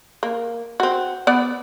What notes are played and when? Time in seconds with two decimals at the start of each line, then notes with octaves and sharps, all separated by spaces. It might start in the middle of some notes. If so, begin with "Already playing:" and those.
0.23 A#3
0.80 C4 F#4
1.27 B3 D5